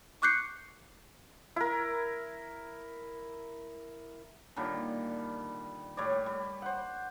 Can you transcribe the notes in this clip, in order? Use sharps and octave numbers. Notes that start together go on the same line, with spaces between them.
C#6 D6 F#6 G6 C7 C#7
E4 A#4
A#2 D3 D#3 G3
A2 G3 C#5 D5
G3
C5 F#5